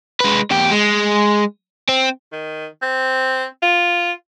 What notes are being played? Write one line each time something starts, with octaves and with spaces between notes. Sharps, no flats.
G#3 B4
E2 G4
G#3
C4
D#3
C4
F4